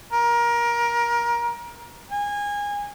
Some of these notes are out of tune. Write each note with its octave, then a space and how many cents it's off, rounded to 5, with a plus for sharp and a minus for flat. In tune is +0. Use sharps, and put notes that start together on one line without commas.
A#4 +25
G#5 -25